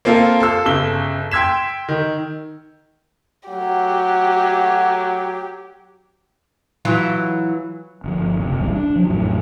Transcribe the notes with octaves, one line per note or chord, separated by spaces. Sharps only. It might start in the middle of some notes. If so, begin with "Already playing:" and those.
A#3 C4 F4 A4 F5
A4 F5 E6
G1 C#3 E6 G7
G5 C6 E6 G#6 B6 E7
D#3
F#3 A3 F#4 G4 F#5
E3 F#3 F4
G1 F3
F#1 C3
D#1 B1 E3 G3
D4
F3 F#3
A1 F2 F#3 A3